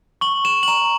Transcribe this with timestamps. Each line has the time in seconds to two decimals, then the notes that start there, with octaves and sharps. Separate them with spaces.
0.21 C#6 F#7
0.45 E7
0.63 F#7
0.68 A#5 E7